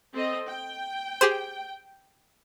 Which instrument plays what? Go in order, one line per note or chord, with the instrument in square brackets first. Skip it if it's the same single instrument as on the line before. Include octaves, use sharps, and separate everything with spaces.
[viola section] C4 A4 D#5
G5
[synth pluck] G4 G#4 C5